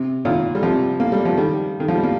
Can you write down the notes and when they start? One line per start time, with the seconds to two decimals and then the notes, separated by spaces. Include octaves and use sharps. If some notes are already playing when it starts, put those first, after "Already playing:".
Already playing: C3
0.25 A#2 D#3
0.55 G3
0.62 C3 F3
1.00 A#3
1.12 G3
1.25 F3
1.37 D#3 G3
1.80 D#3
1.88 F3
1.95 G3
2.03 A#3